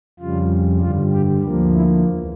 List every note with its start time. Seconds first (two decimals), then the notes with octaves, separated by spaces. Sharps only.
0.19 F2 C#3 G3 F4
0.81 G2 D3 G3 F4
1.12 G4
1.43 D2 D3 F3 A#3
1.73 E4
2.04 E2